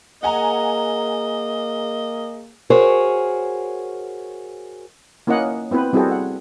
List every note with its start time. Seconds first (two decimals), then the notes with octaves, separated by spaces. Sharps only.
0.23 A#3 G#4 D#5 F#5 G#5 A#5
2.70 F#4 G#4 A#4 C5 C#5
5.27 A#3 C#4 E4 C#5 D#5 F#5
5.71 B3 C4 E4 B4
5.93 G3 C4 E4 F#4 G#4 A4
6.11 F#5